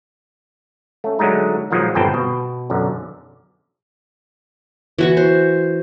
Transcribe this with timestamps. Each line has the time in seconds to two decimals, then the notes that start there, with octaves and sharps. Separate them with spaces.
1.04 A3 C#4
1.19 D3 F#3 G#3 A3 D#4
1.71 A#2 D#3 F3 F#3 G#3
1.95 G1 A#2 C4 B4 G5 A5
2.14 B2
2.70 B1 F#2 D3
4.98 E3 F#4 C#6
5.17 C5